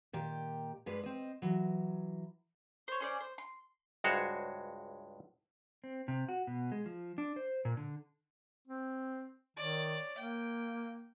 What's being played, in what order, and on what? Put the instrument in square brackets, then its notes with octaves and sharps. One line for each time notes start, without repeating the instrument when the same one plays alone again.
[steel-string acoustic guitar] A#2 D#3 G4 G5
G2 G3 G#3 B4
C4 D#5
E3 F#3
[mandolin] C5 C#5
C#4 C5 D5
C5
C6
[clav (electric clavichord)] C#2 G2 G#3 F#4 C5 C#5
[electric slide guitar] C4
C3
F#4
B2
G#3
F3
D4
C5
A#2
D3
[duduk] C4
[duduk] D#3 [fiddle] C#5 D5
[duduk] A#3 [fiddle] G5